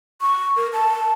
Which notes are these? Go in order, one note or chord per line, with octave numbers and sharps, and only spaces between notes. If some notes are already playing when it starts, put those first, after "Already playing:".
C#6
A#4
A5